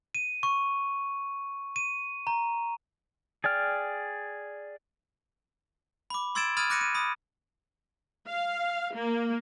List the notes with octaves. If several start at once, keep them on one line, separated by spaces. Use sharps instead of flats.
D#7
C#6
D#7
A#5
G#4 D5 G5 F6
B5 D6
C6 E6 G#6 A6 D7 E7
B5 D#6 F6 G#6 A6 D#7
D6 F#6 A#6 C#7 D#7
D#7
B5 D#6
F5
A#3